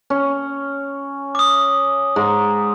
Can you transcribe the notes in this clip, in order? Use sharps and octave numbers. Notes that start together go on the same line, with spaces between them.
C#4
D6 D#6
G#2